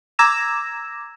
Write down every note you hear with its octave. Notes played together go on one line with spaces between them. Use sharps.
A#5 D6 E6 G#6 A#6 E7